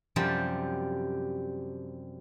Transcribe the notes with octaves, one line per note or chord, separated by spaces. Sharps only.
F#2 C3 F3 G3 G4 D5